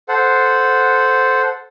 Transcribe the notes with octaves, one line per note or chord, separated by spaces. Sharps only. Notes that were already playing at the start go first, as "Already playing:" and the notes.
A4 C5 F#5